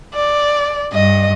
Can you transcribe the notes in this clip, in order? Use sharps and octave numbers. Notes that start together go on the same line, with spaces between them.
D5
G2 D#5